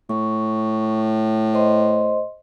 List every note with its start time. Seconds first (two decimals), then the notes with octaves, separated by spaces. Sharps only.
0.09 A2 C#6
1.53 C5 D#5 C6